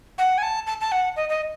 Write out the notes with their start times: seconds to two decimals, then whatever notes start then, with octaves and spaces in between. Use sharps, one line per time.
0.18 F#5
0.38 G#5
0.43 A5
0.67 A5
0.81 A5
0.92 F#5
1.16 D#5
1.29 D#5